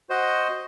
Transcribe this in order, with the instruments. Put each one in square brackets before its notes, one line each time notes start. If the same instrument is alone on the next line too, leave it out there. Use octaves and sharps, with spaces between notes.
[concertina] F#4 C5 D#5 F#5